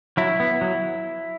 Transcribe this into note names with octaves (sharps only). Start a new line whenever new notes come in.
F#3 E4
B3
F#3